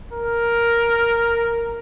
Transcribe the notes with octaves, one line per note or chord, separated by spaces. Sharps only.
A#4